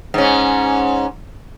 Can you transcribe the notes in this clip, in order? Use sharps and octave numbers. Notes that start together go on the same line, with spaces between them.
G#2 C#4